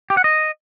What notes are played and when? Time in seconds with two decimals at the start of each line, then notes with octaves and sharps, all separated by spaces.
0.10 G4
0.17 F#5
0.24 D#5